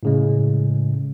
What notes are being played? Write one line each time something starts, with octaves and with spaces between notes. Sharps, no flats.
A2 C#3 G#3